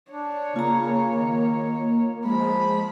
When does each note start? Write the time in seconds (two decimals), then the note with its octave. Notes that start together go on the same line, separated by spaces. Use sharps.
0.11 D4 C#5
0.56 C#3 A#3 F4 A#5
1.13 D#3
2.25 F3 G#3 B5